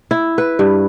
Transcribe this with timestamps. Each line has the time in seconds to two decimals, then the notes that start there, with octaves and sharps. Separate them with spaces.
0.11 E4
0.38 B4
0.59 G2